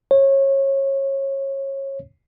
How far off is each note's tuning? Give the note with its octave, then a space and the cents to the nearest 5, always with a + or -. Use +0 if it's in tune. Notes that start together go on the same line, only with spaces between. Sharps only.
C#5 -25